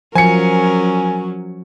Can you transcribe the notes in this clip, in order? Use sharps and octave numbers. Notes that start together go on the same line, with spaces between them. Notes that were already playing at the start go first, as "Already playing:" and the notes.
F3 F#3 C#4 A#4 G#5 C#7